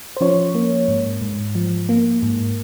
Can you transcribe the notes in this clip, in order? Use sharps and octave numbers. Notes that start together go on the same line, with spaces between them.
C5
F3 C#4 C#5
A#3
G#2
G#2
F3
A#3
G#2